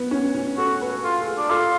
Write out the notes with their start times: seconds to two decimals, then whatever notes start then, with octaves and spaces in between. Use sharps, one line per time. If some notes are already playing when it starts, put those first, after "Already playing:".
Already playing: B3
0.11 C#4
0.34 C#4
0.58 F#4 A4
0.81 B4
1.03 F4 A4
1.21 A4
1.26 G#4
1.38 D4
1.50 F4 A4